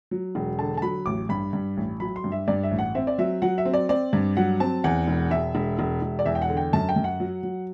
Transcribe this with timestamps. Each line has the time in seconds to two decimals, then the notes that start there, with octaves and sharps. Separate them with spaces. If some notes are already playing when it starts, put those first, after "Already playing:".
0.11 F#3
0.35 E1
0.59 D3 A5
0.77 A5
0.82 F#3 B5
1.06 A1 D6
1.29 G2 B5
1.53 G2
1.77 A1
2.00 F#3 B5
2.16 C6
2.24 G2
2.32 E5
2.48 G2 D5
2.63 E5
2.71 A1
2.79 F#5
2.95 C4 E5
3.07 D5
3.18 F#3 E5
3.42 F#3 F#5
3.58 E5
3.65 C4
3.74 D5
3.89 C4 D5
4.13 G2
4.37 F#3 F#5
4.60 C4 A5
4.84 E2 F#5
5.07 E1
5.31 E1 E5
5.55 E1
5.79 E1
6.02 E1
6.19 D5
6.26 E2 E5
6.35 G5
6.42 F#5
6.49 D3
6.57 G5
6.73 F#2 A5
6.89 G5
6.96 F#2
7.04 F#5
7.20 F#3
7.43 F#3